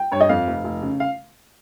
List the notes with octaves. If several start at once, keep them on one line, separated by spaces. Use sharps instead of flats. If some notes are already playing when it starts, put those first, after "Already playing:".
Already playing: G5
G2 C#5
D#5
F2 F5
F1
F1
C#3
F5